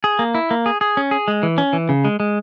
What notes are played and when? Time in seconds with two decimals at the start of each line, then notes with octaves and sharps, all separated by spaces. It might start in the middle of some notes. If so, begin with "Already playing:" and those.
0.04 G#4
0.19 A#3
0.35 E4
0.51 A#3
0.66 G#4
0.81 G#4
0.97 C#4
1.11 G#4
1.28 G#3
1.43 E3
1.58 C#4
1.73 E3
1.89 C#3
2.05 G#3
2.20 G#3